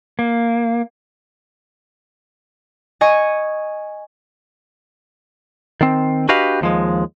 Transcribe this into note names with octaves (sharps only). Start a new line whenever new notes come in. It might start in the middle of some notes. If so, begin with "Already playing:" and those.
A#3
D#5 G#5 C#6
D#3 C4
D4 F#4 G4 B4 D#5 F5
D#2 F3 G#3